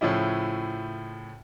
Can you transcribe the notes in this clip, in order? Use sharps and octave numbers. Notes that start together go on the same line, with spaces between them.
A2 C#3 F3 C#4 E4